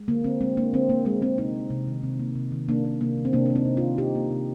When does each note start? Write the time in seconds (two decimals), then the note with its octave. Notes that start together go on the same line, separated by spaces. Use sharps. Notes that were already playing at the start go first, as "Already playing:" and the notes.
Already playing: G#3
0.08 D3 A#3
0.24 D3 C4
0.41 G#3 C4
0.57 G#3 A#3 D4
0.73 D3 C4
0.89 D3 A#3
1.05 G#3 C4
1.21 G#3 C4
1.38 C3 C4 D#4
1.55 A#3
1.70 C3
1.87 D#3
2.03 C3
2.20 A#3
2.35 C3
2.52 D#3
2.68 C3 A#3 D4
2.85 A#3
3.01 C3 A#3
3.18 D#3
3.25 C4
3.33 C3 A#3 D4
3.46 A#3 D4
3.56 C4 D#4
3.65 C3
3.77 D4 F4
3.83 D#3
3.98 C3 D#4 G4
4.15 A#3
4.30 C3